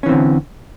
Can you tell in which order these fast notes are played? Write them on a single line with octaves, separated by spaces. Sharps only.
C#4 E3 C4 D3